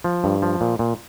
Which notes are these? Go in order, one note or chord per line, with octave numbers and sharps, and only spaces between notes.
F3
G2
F3
A#2
A#2